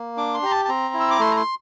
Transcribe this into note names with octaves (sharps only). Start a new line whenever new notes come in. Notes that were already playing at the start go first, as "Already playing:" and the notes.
Already playing: A#3
D4 D6
C6
G4 A#5
A5
A5
C4 A#5
E4
E6
D6
A3 C6
A#5
C6